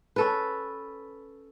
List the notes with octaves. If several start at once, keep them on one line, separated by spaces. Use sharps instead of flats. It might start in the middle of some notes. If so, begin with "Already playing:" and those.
C#4 A4 B4